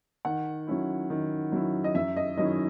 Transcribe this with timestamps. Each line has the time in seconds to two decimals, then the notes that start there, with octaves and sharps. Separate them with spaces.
0.25 D#3 F#5
0.67 F#3 C#4 E4
1.10 D#3
1.52 F#3 C#4 E4
1.84 D#5
1.95 F#2 E5
2.17 D#5
2.38 D#3 F#3 C#4 E4 D#5